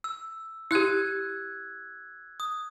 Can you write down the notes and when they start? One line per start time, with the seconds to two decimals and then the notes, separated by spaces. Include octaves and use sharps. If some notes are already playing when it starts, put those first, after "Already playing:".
0.04 E6
0.71 E4 G4 E6 F#6 G#6
2.40 D#6